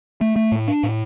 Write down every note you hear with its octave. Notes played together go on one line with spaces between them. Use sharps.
A3
A3
A2
D4
A2